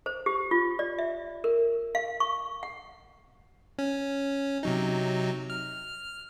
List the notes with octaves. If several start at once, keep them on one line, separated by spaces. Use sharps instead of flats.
C5
G4
F4
D5
E5
A#4
F5
C#6
F#5
C#4
C3 F#3 D#4
F6